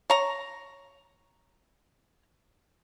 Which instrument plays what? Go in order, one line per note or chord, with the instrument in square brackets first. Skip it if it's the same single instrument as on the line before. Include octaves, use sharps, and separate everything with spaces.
[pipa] C#5 A#5